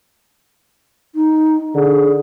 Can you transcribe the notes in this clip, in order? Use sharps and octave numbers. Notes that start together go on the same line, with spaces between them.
D#4
D3 G#4